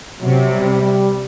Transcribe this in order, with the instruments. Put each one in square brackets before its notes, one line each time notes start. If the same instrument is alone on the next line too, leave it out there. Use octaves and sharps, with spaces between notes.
[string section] C3 [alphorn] F#3
[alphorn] G3
G3